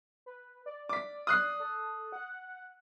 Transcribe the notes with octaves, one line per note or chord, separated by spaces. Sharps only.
B4
D5
D6 B6
D#6 F#6 C7
A4
F#5